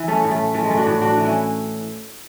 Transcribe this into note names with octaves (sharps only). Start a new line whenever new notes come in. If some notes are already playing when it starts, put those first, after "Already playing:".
Already playing: E3 E4
A3 C#4
A2
A3
E3 A3
G#3
A3
D4 F#4
A2
D4 F#4
E3
C#4 E4